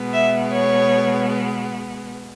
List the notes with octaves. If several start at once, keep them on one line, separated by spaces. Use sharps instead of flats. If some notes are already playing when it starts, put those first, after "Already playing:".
Already playing: B2 G#3 B3
E5
C#5